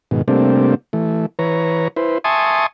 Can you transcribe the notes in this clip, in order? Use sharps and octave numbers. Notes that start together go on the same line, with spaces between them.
G#2 B2 D#3
C3 G3 A3 A#3 C4 D4
E3 A3
E3 B4 C#5 A#5
E4 B4 C5
E5 G#5 A5 C6 C#6 D#6